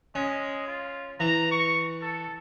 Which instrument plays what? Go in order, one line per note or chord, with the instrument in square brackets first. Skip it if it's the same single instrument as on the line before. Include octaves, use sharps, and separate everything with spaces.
[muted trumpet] G#3 [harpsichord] C#4
[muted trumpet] F4
[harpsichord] E3 [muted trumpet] A#5
[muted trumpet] C#6
A4